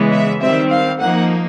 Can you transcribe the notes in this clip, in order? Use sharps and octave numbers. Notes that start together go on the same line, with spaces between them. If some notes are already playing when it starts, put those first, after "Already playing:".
Already playing: C#3 E3 G#3 B3
E5
D#3 G3 C4 E5
F5
F3 A#3 D#4 F#5